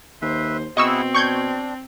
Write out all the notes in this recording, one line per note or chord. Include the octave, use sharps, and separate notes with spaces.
D#2 B4 C5 E5
B2 C4 E4 G#4 D#5 F#5 C#6 E6
D4 C#6 G6 G#6